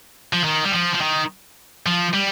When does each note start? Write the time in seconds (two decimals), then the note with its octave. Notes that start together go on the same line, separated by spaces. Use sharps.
0.33 F3
0.44 D#3
0.64 G3
0.72 F3
0.95 F3
1.02 D#3
1.86 F3
2.14 G3